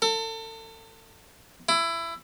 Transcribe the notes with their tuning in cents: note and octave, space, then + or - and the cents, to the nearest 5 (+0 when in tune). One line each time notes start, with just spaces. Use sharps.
A4 +35
E4 +20